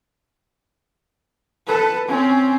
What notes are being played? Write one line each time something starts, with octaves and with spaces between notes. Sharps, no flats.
A4 B4
C4 C#4